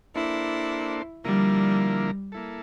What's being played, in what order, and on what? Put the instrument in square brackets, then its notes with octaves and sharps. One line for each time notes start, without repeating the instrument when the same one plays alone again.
[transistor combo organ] A#3 D4 A4 C5 [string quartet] E4
[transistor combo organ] D3 F3 A#3 E4 A#4 [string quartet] G3
[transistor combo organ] A#3 E4 A4